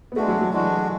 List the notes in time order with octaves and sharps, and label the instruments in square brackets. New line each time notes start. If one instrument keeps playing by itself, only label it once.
[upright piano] B3
[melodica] G#3 D4 F#4 [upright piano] A3
[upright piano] F#3
F#3
[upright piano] E3 [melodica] G#3 D4 F#4